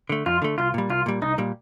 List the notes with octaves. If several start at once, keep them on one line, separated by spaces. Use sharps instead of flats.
D3 A3
F2 F4
D3 A3
C2 F4
A#2 G3
C2 F4
A#2 G3
C2 D#4
A#2 G3